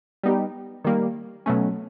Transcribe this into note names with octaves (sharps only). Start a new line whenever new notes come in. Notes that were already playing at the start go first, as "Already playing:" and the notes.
G3 B3 D#4 G4
D#3 G3 A#3
B2 F#3 A3 C#4